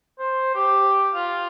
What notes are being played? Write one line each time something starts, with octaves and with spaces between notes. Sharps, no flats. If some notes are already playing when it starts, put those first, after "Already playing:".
C5
G4
F4